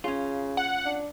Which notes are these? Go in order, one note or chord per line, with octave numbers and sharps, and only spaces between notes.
C#3 C#4 F4
F#5
D4